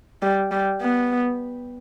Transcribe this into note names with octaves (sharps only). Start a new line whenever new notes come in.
G3
G3
B3